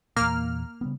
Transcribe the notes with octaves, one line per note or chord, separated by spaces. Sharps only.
E2 A#2 A#3 F6
C#3 G3 B3